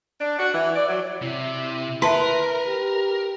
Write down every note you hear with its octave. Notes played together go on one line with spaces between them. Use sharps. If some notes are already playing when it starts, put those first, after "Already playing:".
D4
F#4
E3
D5
F#3
C3 E4
A#4 B4 E5 A5 C6
G4